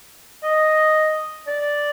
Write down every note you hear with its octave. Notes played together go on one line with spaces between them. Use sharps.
D#5
D5